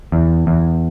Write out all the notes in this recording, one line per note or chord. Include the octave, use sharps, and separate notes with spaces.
E2
E2